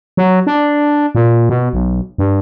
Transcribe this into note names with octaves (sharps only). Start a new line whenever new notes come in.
F#3
D4
A#2
B2
B1
G2